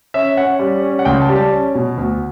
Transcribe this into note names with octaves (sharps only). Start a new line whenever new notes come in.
C#4 E5
C#4 F#5
G3
C#4
F#5
C#2 G5
A5
G3
A5
C#4
B2
D2